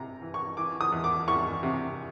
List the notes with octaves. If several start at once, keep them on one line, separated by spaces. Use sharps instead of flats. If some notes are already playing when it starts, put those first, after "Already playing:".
Already playing: C3 A#5
E3
C#6
E3 D6
D#6
E2
D6
E2 C#6
C3